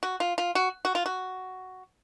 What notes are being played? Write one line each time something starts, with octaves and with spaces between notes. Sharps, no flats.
F#4
F4
F4
F#4
F#4
F4
F#4